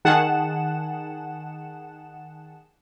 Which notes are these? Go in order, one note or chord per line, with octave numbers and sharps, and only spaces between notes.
D#3 G#4 F#5 A5 E7